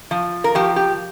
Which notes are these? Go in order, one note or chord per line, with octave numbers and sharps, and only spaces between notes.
F3
A#4
F3 G4
G4